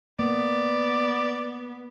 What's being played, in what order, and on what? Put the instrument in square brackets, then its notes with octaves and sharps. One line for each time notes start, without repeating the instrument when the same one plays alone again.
[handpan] A#3 [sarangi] B3 [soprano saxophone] D5